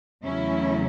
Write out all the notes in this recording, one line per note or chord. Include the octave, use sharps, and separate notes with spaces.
E2 C#3 F#3 A3 C#4 E4